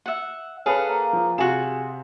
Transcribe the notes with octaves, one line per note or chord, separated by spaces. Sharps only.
E5 F#5
C#4 G#4 A4 B4 F5 F#5 A5
A#3
F3
C3 F4 F#4 G#4 E7